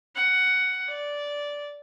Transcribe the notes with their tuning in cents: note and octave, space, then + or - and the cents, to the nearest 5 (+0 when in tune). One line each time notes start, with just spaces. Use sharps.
F#5 +10
D5 -10